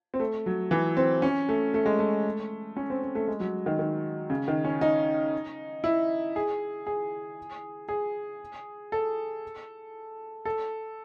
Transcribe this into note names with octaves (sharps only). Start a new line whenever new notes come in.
C4
A3
F#3
E3
C4
C#4
A3
A3
G#3
A3
C#4
C4
C4
A3
G#3
F#3
D#3
D#3
C#3
D#3
C#4
D#4
E4
G#4
G#4
G#4
A4
A4